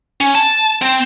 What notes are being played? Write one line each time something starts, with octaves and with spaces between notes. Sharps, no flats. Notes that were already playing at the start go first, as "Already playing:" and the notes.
C#4
A5
C4